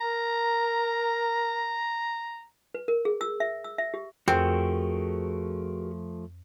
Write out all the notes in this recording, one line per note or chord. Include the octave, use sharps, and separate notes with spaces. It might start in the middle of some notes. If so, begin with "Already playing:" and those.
A#4 A#5
B4
A#4
G#4
E6
E5
E6
E5
G4
F2 F3 A3 C4 F#4 G#4 A#4